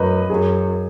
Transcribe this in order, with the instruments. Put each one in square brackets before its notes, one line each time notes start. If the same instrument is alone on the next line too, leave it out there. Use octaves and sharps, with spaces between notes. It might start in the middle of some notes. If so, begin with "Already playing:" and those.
Already playing: [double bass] F#2 [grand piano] B4 D#5
[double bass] F#2 [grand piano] G#4